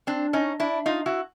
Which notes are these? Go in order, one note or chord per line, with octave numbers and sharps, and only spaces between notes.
C4 D4
C#4 D#4
D4 E4
D#4 F4
E4 F#4